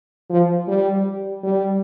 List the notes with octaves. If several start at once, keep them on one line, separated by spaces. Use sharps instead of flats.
F3
G3
G3